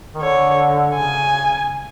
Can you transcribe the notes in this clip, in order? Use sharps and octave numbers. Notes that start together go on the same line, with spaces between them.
D#3
D3 C#5
C#3 G#5